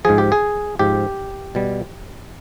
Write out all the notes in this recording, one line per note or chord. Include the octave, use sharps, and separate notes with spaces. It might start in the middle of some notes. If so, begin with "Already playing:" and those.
G#2 F3 G#4
G4
G#4
G#2 F3 G4
B2 G3